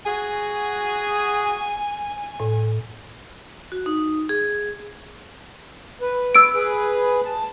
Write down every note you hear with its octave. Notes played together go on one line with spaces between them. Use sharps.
F#4 G#4 G#5
A2
F#4
D#4
G#4
B4
E6 D7
G#4 B4
A5